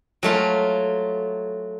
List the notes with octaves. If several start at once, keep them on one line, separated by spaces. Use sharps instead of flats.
F#3 A3 F4